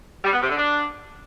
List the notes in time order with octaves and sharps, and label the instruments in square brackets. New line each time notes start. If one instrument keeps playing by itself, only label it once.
[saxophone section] G3
B3
C3
D3
D4